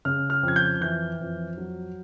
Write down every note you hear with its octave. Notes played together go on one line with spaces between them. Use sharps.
C#3 F6
F6
F2
G#6
G6
E3 G6
F2
F#3